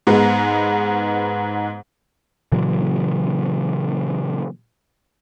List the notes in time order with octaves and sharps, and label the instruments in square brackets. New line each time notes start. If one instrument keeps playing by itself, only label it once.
[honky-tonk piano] G#2 G#3 B3
[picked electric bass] A#2 C#3 E3 F#3